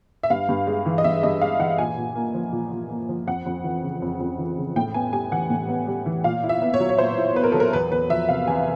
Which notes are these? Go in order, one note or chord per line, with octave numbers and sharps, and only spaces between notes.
E5
G2 F5
G2
G#3
E3
D#5
G2 E5
G2 D#5
G#3 F5
E3 F#5
A#2 G#5
A#2
A#3
F3
A#2
A#2
A#3
F3
F2 F#5
F2
E3
C#3
F2
F2
E3
C#3
A2 G5
B3 G#5
G3 G#5
E3 F#5
A2
B3
G3
E3
A#2 F5
E4
E5
B3
C#5
F#3
C#5
A#2 C5
E4
B3 B4
A#4
F#3 A4
A#4
E2 B4
E2 B4
F3 E5
C3 F5
E2 G#5